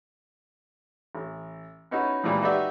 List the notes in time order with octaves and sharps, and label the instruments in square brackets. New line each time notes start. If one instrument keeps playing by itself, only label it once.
[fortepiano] A1
B3 C#4 D#4 E4 F#4
A#2 E3 F3 G3 G#3
D#4 F#4 G4 B4 D5 E5